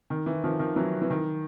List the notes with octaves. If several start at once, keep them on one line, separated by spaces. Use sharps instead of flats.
D#3
E3
D#3 F3
D#3 F3
E3 F#3
E3
D#3